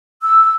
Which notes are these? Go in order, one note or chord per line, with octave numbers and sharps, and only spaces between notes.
E6